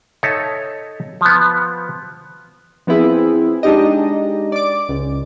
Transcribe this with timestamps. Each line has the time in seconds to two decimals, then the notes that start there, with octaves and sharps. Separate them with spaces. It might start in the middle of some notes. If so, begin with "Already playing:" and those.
0.23 D#4 A4 C#5 D#5 E5
1.21 F3 B3
2.87 F3 B3 C4 E4 G#4
3.63 G#3 D4 D#4 G4 D#5
4.52 D5 D6
4.89 C#2